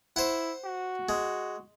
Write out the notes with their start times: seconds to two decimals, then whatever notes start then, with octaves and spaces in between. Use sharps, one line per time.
0.16 E4 C5 F#5
0.65 F#4
1.09 G#3